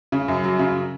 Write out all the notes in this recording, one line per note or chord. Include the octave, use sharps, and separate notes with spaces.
C#3
F#2
F#3
C#3